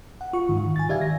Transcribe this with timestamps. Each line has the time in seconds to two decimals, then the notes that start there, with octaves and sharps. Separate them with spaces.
0.21 F#5
0.33 F4 C#6
0.49 G#2 D#3
0.76 G#5 A6
0.89 D#3 G4 D5 E5 F5 G#6
1.01 A#6